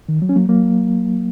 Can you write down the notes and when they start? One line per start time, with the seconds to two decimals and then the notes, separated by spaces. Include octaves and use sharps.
0.09 D#3
0.22 F#3
0.29 C#4
0.36 F#3 A#3
0.49 F#3 A#3